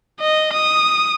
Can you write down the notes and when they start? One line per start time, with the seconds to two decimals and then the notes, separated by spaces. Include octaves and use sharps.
0.20 D#5
0.53 D#6